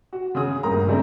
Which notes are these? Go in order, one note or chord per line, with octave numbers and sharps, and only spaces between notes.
F#4
C#3 G#4 D#6
G1 A#2 A#4 A#5
C#3 F3 G#3 A3 C4 D4